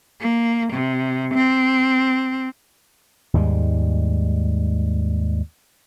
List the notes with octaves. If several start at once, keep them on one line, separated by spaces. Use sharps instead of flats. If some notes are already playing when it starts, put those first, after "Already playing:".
A#3
C3
C4
D#2 G#2 G3 G#3